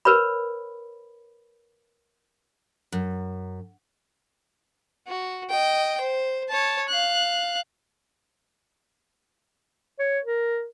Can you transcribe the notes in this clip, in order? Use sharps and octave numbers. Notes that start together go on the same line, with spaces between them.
A#4 B4 C#5 B5
F#2
F#4
D#5 G5
C5
C#5 A5
F5 F#6
C#5
A#4